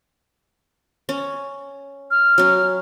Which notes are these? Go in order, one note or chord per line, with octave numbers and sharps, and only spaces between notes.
C#4
F6
F#3 C#4